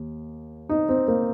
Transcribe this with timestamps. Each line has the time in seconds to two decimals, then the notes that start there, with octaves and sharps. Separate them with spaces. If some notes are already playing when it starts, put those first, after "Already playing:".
Already playing: D#2
0.69 D#4
0.89 C4
1.08 A#3